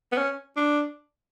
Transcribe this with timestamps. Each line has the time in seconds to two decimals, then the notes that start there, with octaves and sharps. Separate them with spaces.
0.12 B3
0.18 C#4
0.57 D4